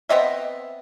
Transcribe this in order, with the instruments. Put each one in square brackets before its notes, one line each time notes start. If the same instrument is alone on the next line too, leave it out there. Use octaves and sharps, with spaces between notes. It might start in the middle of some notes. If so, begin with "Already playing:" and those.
[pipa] B3 C4 D#5 E5